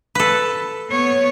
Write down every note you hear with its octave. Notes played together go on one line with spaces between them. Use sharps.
A4 B4
B3 C#5